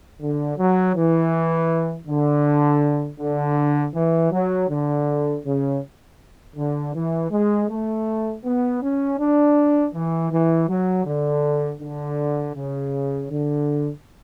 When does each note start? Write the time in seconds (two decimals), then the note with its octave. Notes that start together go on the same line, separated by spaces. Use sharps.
0.21 D3
0.57 F#3
0.96 E3
2.07 D3
3.20 D3
3.94 E3
4.31 F#3
4.69 D3
5.44 C#3
6.56 D3
6.94 E3
7.31 G#3
7.69 A3
8.44 B3
8.82 C#4
9.18 D4
9.93 E3
10.31 E3
10.68 F#3
11.05 D3
11.81 D3
12.55 C#3
13.30 D3